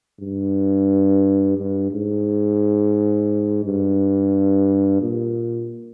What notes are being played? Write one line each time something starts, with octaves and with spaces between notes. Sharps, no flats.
G2
G2
G#2
G2
A#2